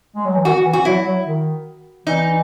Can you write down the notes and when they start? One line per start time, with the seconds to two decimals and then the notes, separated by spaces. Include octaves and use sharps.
0.16 G#3
0.25 F#3
0.35 E3
0.45 D#3 F#4
0.65 E3
0.73 F#4
0.80 E3
0.85 F#3 E4
1.06 F#3
1.26 D#3
2.07 E3 D#4